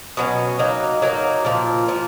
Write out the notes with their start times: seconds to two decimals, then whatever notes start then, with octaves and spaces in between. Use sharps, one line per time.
0.17 B2 F#3 C#4
0.59 F#3 A#3 D#4
1.02 F#3 A#3 D#4
1.45 A#2 F3 A#3
1.88 A#2 F3 A#3